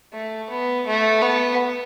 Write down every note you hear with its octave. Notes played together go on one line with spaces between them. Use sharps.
A3
B3
A3
B3